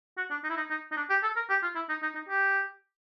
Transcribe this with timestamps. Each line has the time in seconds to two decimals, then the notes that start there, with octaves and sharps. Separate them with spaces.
0.17 F#4
0.30 D4
0.44 D#4
0.50 E4
0.57 D#4
0.70 D#4
0.92 D#4
0.96 D4
1.09 G4
1.23 A4
1.36 A#4
1.49 G4
1.63 F4
1.75 E4
1.89 D#4
2.02 D#4
2.15 D#4
2.28 G4